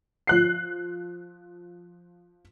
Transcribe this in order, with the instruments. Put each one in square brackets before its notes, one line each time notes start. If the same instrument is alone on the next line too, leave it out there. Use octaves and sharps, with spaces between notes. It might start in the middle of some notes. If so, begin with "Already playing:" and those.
[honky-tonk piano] F3 F#6 C7